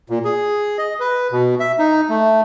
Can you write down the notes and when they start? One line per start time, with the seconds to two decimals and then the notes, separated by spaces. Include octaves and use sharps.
0.10 A#2
0.24 G#4
0.78 D#5
1.00 B4
1.31 B2
1.60 E5
1.79 D#4
2.09 A3